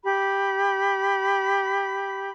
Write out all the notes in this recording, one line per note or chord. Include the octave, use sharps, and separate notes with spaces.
G4 B5